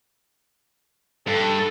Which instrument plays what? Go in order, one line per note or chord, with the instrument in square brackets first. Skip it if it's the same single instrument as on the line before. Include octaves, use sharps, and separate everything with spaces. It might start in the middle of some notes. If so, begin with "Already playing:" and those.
[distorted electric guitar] G2 [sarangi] A4